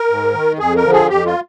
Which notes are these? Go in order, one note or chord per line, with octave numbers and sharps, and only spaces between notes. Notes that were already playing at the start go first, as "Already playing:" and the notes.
Already playing: A#4
G#2
D#3
F2 G#4
A#4
D3 F3
G#4
F2 G4
F4